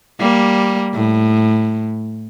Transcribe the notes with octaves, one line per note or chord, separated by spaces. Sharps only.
G3 A#3
A2